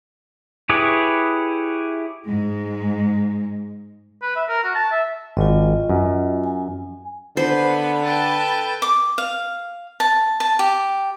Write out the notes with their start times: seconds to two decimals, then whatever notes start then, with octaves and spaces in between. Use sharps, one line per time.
0.69 E4 G4 G#4 B4 C#5
2.26 G#2 G#3
4.22 B4
4.36 E5
4.49 A#4
4.64 F#4
4.75 A5
4.92 E5
5.37 G#1 F4 D#5
5.89 F#2
6.44 G#5
7.37 D3 B3 B4 C5 B5
8.03 A4 B4 G5 A5
8.82 D6
9.18 F5
10.00 A5
10.40 A5
10.59 G4